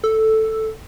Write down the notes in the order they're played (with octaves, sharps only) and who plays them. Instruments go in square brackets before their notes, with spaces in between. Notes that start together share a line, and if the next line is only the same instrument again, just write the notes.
[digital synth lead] A4